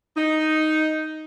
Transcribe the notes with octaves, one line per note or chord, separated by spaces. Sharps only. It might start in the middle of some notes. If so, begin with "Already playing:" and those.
D#4